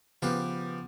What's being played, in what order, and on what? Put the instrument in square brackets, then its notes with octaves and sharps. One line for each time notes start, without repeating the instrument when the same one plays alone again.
[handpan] C#3 B3 [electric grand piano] F3 [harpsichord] G4 B4 F5